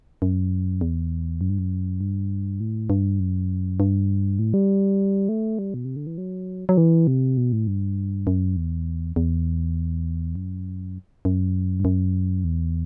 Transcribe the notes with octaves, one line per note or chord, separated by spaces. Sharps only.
F#2
E2
F#2
G2
F#2
G2
A2
G2
F#2
G2
A2
G3
A3
G3
B2
C3
D3
E3
F#3
F#3
E3
C3
B2
A2
G2
F#2
E2
E2
F#2
F#2
G2
F#2
E2